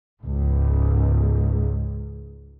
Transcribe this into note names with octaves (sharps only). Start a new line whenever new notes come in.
C#2 G#2